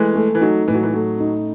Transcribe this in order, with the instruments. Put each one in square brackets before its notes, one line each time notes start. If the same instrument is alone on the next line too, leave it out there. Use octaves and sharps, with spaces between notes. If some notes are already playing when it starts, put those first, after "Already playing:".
Already playing: [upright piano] E3 G#3 [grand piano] A3
[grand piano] A3
[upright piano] E3
[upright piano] F#3 [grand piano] D#4
[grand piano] A2 [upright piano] E3
[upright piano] F#3
E3
[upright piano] F#3 [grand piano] A3
[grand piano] D#4